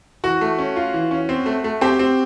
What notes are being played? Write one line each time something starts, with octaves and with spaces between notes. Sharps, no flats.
E3 F#4
A3
C#4
F4
E3
C#4
C4
A3
A3
C4 G4
C4